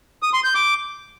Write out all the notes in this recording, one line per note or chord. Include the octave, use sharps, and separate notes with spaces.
D#6
C6
G6
D6